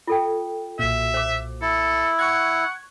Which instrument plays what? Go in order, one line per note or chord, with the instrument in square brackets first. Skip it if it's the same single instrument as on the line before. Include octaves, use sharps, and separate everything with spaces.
[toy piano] F4 A4 G5
[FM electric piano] B1 A#2 [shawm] E5
[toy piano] C5 D6
[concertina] E4 [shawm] A4
[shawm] F#5 [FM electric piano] C#6 F#6 G#6